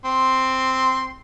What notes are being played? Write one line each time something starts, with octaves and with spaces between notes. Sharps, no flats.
C4 C6